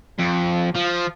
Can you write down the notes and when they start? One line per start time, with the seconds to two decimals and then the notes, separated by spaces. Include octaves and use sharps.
0.19 F2
0.75 F3